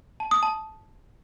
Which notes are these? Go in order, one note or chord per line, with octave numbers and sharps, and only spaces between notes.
A5
D#6
A5